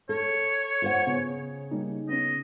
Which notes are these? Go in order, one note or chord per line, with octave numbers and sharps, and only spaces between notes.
A4 C#5
F4 C5 F#5
C#3 B3
G3 A#3 D#4
B3 C#4 D#5